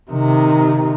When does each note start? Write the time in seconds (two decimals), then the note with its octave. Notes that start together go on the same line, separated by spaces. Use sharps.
0.11 C3 D#3